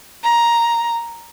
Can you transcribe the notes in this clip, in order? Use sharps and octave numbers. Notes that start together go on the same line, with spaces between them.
A#5